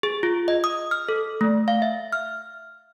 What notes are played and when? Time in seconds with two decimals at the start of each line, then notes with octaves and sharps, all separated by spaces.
0.03 G#4
0.23 F4
0.48 D#5
0.64 D#6
0.91 F6
1.09 A4
1.41 A3
1.68 F5
1.82 E5
2.12 F6